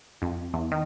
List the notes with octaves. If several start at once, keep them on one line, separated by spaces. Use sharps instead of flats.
F2
E2
D#3